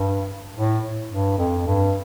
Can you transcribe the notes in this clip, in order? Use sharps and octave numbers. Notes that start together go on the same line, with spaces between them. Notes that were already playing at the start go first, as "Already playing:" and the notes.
Already playing: G2
A2
G2
F2
G2